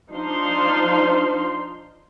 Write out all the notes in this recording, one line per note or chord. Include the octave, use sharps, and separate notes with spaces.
F3 D4 D#4 C5 F5 C6